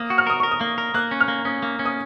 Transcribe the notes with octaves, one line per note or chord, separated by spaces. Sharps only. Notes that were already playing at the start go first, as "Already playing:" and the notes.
Already playing: A#3 D#6
F#4
F6
A#4 D#6
A#4 C#6
D#6
A#3
A#4
A#3 F#6
C#4
F6
A#3
C#4 D#6
A#3
C#4
D#6